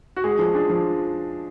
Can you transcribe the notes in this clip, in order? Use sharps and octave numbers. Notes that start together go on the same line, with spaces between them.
F#4
G#3 G#4
F3
D4 G#4
F3